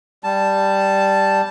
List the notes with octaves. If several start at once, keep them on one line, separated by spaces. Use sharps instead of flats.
G3 A5